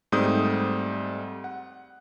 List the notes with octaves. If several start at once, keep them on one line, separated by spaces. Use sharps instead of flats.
G#2 G3 A3 C4 D#6 G6
F#5